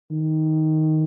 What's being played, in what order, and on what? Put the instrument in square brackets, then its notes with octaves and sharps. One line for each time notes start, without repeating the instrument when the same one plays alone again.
[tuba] D#3